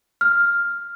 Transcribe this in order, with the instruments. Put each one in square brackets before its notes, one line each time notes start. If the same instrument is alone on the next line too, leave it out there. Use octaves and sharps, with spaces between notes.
[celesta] F6